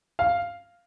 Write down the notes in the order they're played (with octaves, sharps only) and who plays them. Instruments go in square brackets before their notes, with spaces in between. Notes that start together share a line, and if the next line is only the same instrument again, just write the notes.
[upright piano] F5